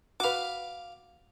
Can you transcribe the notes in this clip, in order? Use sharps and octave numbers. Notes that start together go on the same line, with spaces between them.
F#4 B4 F5 D6